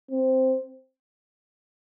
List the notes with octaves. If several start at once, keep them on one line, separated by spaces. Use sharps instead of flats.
C4